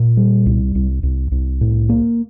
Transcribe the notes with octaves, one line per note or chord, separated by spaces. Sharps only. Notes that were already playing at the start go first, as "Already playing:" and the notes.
Already playing: A#2
G3
C2
C2
C2
C2
A2
A#3